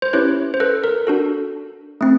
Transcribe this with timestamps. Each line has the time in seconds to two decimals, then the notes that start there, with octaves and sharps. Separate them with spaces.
0.02 C5
0.13 C#4 E4 G4 B4 C#5
0.54 C5
0.60 A4 B4
0.84 A#4
1.07 D4 F#4 A4
2.01 A3 C4